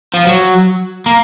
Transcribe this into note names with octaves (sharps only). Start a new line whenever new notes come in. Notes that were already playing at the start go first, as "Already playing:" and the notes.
F3
F#3
A#3